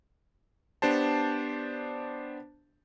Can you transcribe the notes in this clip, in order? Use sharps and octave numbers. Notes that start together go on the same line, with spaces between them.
B3 D4 G4 C5 A5